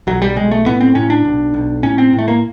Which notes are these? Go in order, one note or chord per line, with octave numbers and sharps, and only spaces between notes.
B1 F#3
G3
B1 G#3
A3
A2 B3
C4
A2 C#4
D4
B1
B1
A2 C#4
C4
A2
A3
A#3